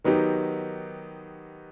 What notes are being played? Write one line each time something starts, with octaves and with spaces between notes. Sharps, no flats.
D#3 F#3 B3 D#4 G4